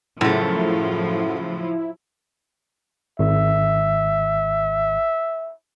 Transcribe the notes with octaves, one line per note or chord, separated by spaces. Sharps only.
F#2 A2 C#3 F3 F#3 A3 E4
G#1 E5